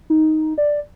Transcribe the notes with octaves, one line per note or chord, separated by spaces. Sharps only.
D#4
D5